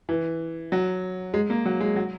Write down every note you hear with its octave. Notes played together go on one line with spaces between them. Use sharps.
E3
F#3
G#3
A#3
F#3
G#3
F#3